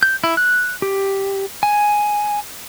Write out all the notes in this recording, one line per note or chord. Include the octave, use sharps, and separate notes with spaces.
G6
E4
F#6
G4
G#5